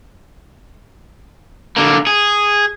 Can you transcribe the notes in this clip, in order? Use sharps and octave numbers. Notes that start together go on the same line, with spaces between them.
D3 A#3
G#4